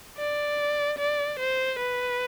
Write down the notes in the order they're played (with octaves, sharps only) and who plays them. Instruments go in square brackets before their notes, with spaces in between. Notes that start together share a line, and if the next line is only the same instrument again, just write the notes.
[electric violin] D5
D5
C5
B4